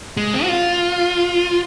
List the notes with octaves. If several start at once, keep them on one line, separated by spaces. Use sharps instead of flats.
G#3
C4
F#4
F4